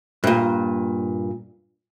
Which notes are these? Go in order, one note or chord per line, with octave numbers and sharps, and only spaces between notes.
G2 A#2